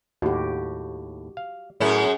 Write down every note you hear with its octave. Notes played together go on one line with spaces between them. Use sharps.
D#2 A2 F#4 G4
F5
F#2 A2 C#4 E4 G#4 A#4